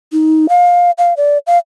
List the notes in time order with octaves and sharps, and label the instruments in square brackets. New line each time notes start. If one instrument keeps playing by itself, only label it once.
[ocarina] D#4
F5
F5
D5
F5